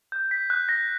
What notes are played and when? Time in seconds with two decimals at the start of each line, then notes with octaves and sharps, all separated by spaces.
0.12 G6
0.31 B6
0.50 F#6
0.69 A#6